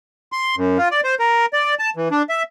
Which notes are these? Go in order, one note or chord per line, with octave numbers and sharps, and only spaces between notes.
C6
F#2
F4
D5
C5
A#4
D5
A5
E3
D4
E5